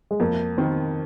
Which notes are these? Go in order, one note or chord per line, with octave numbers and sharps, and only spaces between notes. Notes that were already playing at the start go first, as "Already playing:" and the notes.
G#3
F2 A#3
D#3 C4